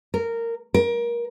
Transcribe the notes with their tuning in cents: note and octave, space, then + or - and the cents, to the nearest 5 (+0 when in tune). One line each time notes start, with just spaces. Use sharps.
A#4 -15
A#4 +25